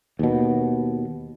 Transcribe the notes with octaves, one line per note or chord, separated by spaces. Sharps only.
D#2 B2